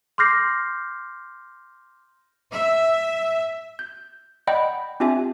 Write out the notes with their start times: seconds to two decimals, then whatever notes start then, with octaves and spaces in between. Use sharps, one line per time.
0.18 C6 D6 F6 G6 A#6 C7
2.53 E5
3.79 G6
4.47 D5 D#5 F#5 G5 B5 G6
5.00 C4 D4 F4 G4 E5 G#5